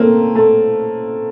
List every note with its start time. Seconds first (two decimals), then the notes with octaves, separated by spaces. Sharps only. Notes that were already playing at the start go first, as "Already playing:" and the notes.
Already playing: A3 A#3 C4
0.35 A3